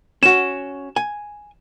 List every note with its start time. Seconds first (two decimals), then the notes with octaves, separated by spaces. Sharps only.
0.23 C#4 F#4 E7
0.96 G#5